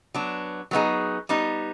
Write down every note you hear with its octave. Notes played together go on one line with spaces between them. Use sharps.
F#3 B3 D4
F#3 B3 D#4 G#4
G3 B3 D#4